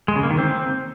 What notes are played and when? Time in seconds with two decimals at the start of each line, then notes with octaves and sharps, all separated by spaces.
0.08 G#3
0.16 C#3
0.23 A#3
0.31 D#3
0.38 C4